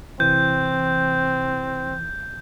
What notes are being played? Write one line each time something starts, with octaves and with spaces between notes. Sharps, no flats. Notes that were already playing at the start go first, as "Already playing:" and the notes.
C3 E3 C4 G6